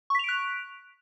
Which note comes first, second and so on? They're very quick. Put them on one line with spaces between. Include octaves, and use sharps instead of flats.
C#6 B6 F7 D7 F#6